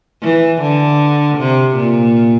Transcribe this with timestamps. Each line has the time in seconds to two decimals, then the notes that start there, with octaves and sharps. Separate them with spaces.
0.23 E3
0.62 D3
1.39 C3
1.77 A#2